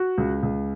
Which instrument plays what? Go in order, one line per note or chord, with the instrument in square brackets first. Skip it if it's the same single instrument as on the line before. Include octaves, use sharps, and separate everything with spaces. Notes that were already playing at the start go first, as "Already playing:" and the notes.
Already playing: [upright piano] F#4
C#2
C#2